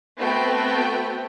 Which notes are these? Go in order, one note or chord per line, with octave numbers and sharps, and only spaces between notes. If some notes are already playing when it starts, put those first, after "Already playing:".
A3 B3 C4 F#4 B4 G5